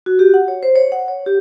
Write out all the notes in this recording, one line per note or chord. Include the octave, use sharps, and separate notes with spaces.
F#4
G4
F#5
C#5
C5
C#5
F#5
C#5
G4